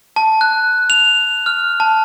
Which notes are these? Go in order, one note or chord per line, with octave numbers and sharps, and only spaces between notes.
A5
F#6
F7
F6
A5